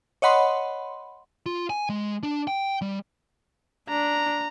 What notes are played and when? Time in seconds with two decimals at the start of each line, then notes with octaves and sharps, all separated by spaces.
0.22 C#5 D#5 F#5 B5 C6
1.46 F4
1.70 G#5
1.89 G#3
2.23 D4
2.47 G5
2.82 G3
3.89 D4 A#5